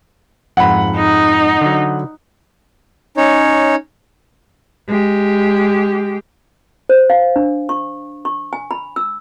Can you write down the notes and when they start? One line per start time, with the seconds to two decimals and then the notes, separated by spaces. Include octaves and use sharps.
0.57 F2 G#2 F#5 B5
0.96 D#4
1.61 D3 F#3
3.17 C#4 D#4 C#5
4.88 G#3 G4
6.89 C5
7.10 F5
7.36 D4
7.69 C#6
8.25 C#6
8.53 G#5
8.71 B5
8.96 E6